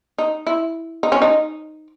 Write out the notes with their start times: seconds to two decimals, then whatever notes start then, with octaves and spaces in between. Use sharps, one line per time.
0.18 D#4
0.47 E4
1.03 D#4
1.12 C#4
1.22 D#4